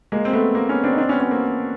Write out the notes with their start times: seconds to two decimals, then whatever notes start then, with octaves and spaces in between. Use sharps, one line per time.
0.12 G#3 A#3
0.25 C4
0.33 A3 B3
0.55 A#3 C4
0.69 B3 C#4
0.84 C4 D4
0.93 D#4
0.98 C4 D4
1.09 B3 C#4
1.20 B3 C#4
1.31 A#3 C4